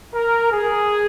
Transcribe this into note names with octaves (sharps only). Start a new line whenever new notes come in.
A#4
G#4